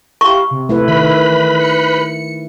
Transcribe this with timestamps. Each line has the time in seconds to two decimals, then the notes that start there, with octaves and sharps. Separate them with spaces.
0.21 E4 G4 F5 C#6
0.51 C3
0.69 A3 E4 B4
0.88 D#3 B4 B5
1.27 E3
1.59 C#7